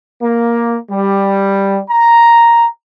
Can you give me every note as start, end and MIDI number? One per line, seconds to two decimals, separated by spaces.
0.23 0.77 58
0.91 1.79 55
1.90 2.67 82